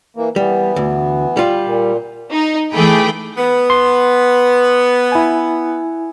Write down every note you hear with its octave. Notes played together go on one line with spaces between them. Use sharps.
E3 A#3
E3 G3 B3
D2
G3 F4
A#2
D#4
E3 A3 G#4 G5 B5 D6
B3
C6
E4 G#5